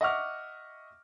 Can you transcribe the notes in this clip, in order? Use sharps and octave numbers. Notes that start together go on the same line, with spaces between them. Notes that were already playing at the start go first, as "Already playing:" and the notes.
D#5 E5 F#5 C#6 D6 F6